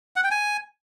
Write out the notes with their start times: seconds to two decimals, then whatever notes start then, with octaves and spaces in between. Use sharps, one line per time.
0.16 F#5
0.24 G5
0.31 G#5